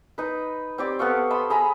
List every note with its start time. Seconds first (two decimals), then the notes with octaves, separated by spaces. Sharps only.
0.18 D#4 B4
0.78 C4 G4 D5
0.99 B3 A4 F5 C#6
1.30 A5 B5 C6 D#6
1.50 G#4 A#5 B5